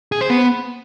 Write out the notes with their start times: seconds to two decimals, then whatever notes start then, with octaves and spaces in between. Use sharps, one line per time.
0.12 G#4
0.21 C5
0.30 B3